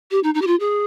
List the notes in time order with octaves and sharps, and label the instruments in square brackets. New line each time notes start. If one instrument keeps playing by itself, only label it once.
[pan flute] G4
D#4
D#4
G4
F4
G#4